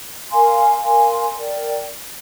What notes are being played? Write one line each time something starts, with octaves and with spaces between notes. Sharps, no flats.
A#4 F5 G#5 C6
A#4 F5 G#5 C6
A#4 D5 G5